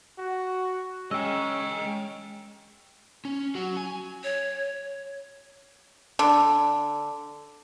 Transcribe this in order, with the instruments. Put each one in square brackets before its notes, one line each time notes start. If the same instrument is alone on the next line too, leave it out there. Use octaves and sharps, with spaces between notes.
[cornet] F#4
[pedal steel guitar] G#3 [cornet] C#4 [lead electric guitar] D#5 G5 [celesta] E6
[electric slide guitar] C#4
F#3 F#4
G#5
[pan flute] C#5
[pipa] D3